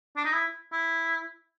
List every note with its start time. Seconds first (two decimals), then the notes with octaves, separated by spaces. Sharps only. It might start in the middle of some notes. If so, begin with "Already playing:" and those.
0.17 D4
0.25 D#4
0.33 E4
0.72 E4